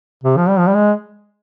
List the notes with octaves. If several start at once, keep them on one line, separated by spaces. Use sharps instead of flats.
C3
F3
G3
F3
G3
G#3